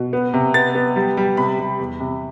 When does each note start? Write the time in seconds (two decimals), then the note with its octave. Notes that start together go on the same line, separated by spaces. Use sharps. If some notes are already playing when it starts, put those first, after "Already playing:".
Already playing: B2
0.13 B3
0.34 C3
0.54 B3 A6
0.75 B3
0.96 G3
1.17 G3
1.37 C3 B5
1.59 G3
1.80 E2
2.00 C3